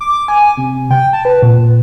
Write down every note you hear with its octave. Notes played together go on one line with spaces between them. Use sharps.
D6
G#5
C3
G5
A5
B4
A#2